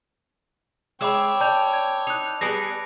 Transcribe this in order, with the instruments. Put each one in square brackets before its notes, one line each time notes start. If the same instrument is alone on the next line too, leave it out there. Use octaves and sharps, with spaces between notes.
[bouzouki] G#3 E5 [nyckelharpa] C#5 G5 [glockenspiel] B5 D6 E6
[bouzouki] D5 [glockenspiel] A5 G6 F7
[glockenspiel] G#6
[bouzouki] D#4 [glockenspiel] F#6 F7
[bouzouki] G3 B3 G#4 [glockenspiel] A#6 D7